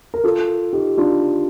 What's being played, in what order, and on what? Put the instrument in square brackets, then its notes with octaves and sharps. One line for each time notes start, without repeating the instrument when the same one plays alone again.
[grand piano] A#4
F4 A4
D#4 G4
D4 F4